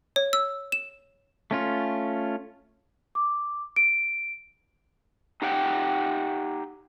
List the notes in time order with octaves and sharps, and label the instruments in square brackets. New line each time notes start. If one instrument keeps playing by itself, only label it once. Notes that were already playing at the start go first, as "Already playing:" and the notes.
[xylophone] C#5
E6
E7
[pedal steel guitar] A3 C#4 F4
[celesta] D6
D7
[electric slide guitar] D#4 G4 F#5 G5